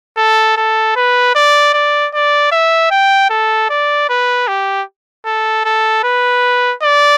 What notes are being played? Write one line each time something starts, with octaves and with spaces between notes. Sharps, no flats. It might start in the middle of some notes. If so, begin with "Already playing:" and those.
A4
A4
B4
D5
D5
D5
E5
G5
A4
D5
B4
G4
A4
A4
B4
D5